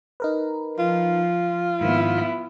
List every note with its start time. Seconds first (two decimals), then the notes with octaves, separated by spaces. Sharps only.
0.20 D#4 A#4 B4
0.79 F3 F4
1.81 G#2 D#3 F3 B3 E4